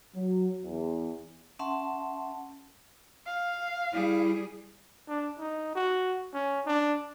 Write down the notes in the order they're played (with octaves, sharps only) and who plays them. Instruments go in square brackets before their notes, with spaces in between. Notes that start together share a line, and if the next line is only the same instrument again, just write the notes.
[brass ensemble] F#3
E2
[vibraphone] C#4 E5 F#5 A5 C6
[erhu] F5
[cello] G3 G#4 [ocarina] E4
[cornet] D4
D#4
F#4
C#4
D4